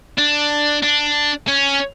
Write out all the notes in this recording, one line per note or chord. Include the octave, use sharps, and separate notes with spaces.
D4
D4
C#4